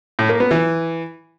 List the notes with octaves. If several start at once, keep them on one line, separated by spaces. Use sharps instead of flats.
A2
A#3
B3
E3